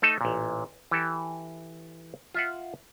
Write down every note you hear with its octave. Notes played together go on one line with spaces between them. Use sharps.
A3 D#4 A4
A1 A#2
E3 G4 A4
F4 E5 F#5